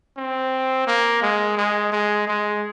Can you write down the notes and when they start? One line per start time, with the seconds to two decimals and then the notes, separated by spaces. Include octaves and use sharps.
0.17 C4
0.87 A#3
1.22 G#3
1.57 G#3
1.92 G#3
2.27 G#3